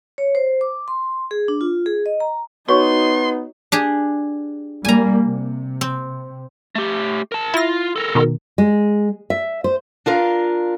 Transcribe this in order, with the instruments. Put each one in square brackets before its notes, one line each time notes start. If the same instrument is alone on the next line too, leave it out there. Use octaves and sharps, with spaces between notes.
[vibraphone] C#5
C5
D6
C6
G#4
D4
F4
G#4
D#5
A#5
[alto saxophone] B3 [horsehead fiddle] D#4 [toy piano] F#4 C#5 C#6 [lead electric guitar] C6
[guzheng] D4 G4 G#4
[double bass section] G3 A#3 [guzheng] G#5 A#5
[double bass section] C3
[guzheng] C4
[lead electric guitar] A3 G4
A#4 A5
[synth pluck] E4 A#6 [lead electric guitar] F4
[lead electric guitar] A4 A#4
[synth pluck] B2 D#3
[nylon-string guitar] G#3
E5
C5
[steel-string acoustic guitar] D4 F4 A#4 F5